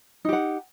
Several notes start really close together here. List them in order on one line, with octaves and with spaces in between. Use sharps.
D#4 G4 F#5